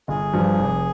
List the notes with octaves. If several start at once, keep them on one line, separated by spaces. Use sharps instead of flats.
G1 G#4
G2 F3
F1